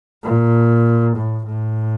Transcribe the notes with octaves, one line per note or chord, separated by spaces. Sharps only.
A#2
A2
A2